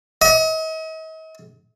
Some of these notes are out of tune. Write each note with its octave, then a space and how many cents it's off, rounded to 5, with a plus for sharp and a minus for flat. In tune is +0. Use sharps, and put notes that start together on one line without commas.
D#5 +40